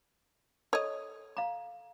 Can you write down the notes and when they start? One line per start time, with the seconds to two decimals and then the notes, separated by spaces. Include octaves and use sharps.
0.73 A4 C#5 D#5
1.37 F5 A#5